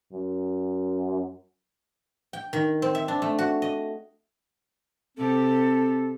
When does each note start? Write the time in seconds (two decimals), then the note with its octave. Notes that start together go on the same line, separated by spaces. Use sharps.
0.12 F#2
2.33 G5
2.53 D#3
2.82 C4
2.95 E5
3.08 D4
3.22 A3
3.39 F#4
3.62 D#5
5.17 C3 C4 G4 A4